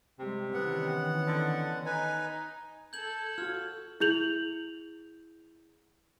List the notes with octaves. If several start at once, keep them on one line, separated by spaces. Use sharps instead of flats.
C3 G3 G#3 B3
D#3 E3 B3 C#4 F#5
D3
D#4 B4 G#5
A4 G6 G#6 F#7
F4 F#4 F6
E4 G#4 G6 F7 F#7